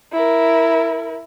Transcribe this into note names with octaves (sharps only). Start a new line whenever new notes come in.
E4 A#4